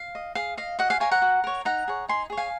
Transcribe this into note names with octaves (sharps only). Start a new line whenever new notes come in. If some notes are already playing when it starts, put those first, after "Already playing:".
Already playing: F5
D#5
G#4 F5
D#5 F5
F#4 D#5 F#5
F5 G#5
A#4 C#5 F5 G#5
F#5 A#5
F#4
A#4 C#5
D#4 F#5 A#5
G#4 C#5
D#4 G#5 C6
G#4 C#5
F5 G#5